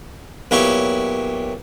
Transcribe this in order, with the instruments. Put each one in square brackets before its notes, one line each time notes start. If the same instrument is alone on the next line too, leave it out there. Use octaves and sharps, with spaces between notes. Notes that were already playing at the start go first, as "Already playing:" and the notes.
[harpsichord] B1 A#2 B3 E4 G4 C#5